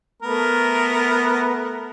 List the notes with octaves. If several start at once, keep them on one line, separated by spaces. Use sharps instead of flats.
A3 B3 A#4